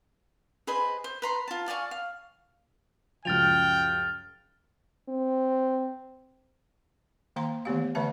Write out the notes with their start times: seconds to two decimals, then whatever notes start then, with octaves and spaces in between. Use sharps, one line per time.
0.67 G#4 B4 C5 D#5
1.04 C5
1.22 B4 A#5 C6
1.48 F4 A5
1.68 D5 F5 G#5 C#6
1.91 F5
3.25 C#2 F#2 F3 G5 F6 A6 F7
5.09 C4
7.36 D#3 A#3 F5 A#5 C6
7.65 D#3 E3 A3 B3 G4 F5
7.95 D3 E3 A3 B4 E5 A5